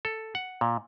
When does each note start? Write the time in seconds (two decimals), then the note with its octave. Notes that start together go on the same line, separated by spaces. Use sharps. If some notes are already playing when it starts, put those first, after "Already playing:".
0.05 A4
0.35 F#5
0.61 A#2